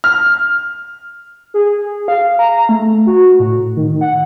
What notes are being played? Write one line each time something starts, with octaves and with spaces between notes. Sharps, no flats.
F6
G#4
F5
A#5
A3
F#4
A2
D#3
F#5